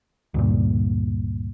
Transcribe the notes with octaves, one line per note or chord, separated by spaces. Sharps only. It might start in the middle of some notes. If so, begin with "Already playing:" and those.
D2 G2 A#2